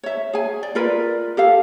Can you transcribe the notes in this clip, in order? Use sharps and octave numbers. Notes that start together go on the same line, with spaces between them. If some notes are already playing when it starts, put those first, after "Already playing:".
C#5 E5
G#4 G#5
D5
F4 A#4 B4 D5
G4 A4 F5